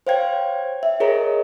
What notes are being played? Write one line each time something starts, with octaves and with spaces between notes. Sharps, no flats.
C5 C#5 F5 G5 G#6
E5
G#4 A#4 C#5 D#5 A#5